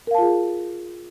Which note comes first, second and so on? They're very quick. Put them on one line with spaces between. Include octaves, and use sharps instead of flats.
A#4 F5 A5 F4 G#4